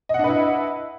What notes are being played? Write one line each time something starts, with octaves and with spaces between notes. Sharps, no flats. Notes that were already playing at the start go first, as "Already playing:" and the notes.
D4 E4 B4 D#5 F#5